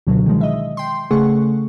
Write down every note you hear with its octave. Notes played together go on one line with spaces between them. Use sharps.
C#2 B2 D3 F#3
D#3 F3 G#3
D#5 E5
G5 C6
C#3 A3 G#4 F#5 C#6